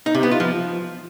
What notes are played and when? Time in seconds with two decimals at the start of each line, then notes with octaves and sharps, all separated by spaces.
0.06 D#4
0.15 C3
0.23 B3
0.31 F4
0.40 F3